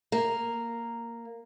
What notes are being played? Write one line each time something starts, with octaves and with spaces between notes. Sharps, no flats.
A#3